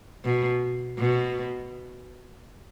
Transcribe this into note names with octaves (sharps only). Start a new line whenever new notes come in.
B2
B2